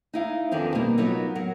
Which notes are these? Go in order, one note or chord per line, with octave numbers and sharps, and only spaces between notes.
D#4 E4 F5
E2 D3 D#3 F3 C4
B2 G3 A#3 D#4
F#3 B3 D#4 F4 A#4
F#3 A#4 F#5